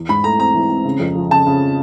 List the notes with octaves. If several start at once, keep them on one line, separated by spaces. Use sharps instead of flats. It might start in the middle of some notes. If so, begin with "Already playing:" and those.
Already playing: E2 E3
G#2 B5
A3 A#5
C4 A#5
E3
C4
C#3
F2
F3
C#3 A5
C#3